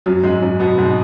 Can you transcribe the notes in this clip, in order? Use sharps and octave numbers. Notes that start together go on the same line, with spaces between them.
F#2 F#3
G#2 G#3
F#2 F#3
B2 B3
G#2 G#3